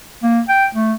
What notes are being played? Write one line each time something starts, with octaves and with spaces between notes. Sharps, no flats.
A#3
G5
A3